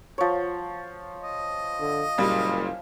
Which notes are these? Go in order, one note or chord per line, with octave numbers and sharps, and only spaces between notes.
F3 C#5
D#5
D3
F#1 A#2 G3